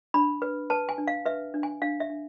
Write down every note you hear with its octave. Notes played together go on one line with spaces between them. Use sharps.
D4 B5
B4
B4 A5
G#5
D4
F5
B4 E5
D4
G#5
D4 F5
E5
D4